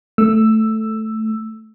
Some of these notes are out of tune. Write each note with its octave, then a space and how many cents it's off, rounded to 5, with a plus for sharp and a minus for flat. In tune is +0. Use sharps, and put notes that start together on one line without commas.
A3 +0 E6 +5